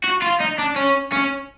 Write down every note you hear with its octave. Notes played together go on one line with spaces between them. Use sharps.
F#4
F4
D#4
D4
C#4
C#4